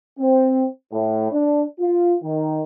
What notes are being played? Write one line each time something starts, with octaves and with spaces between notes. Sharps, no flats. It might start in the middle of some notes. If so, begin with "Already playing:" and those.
C4
A2
D4
F4
D#3